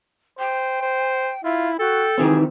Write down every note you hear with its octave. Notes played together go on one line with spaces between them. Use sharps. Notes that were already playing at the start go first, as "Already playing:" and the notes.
C5 G5
C5
E4 F4 E5
F#4 A4 G5
D#3 E3 C4 G4 G#4